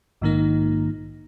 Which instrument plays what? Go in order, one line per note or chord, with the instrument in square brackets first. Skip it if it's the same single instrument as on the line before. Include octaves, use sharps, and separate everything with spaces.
[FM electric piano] A#1 G#2 D#3 A#3 D#4